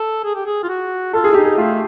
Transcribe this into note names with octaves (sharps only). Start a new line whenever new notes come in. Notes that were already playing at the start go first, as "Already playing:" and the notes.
Already playing: A4
G#4
G4
G#4
F4
F#4
F4 A4
G#4
E4
D#4 G4
G#4
A3 F4